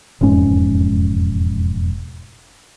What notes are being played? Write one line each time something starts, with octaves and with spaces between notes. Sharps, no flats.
E1 F2 G#2 C#4